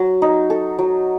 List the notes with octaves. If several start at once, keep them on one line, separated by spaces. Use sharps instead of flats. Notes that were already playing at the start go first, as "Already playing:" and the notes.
Already playing: F#3
D#4
A4
F#3